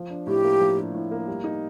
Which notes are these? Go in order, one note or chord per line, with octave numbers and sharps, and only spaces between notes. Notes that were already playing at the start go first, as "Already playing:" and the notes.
Already playing: F3
D4
A2 G4
A#3
F3
D4
A2
A#3
G3
D#4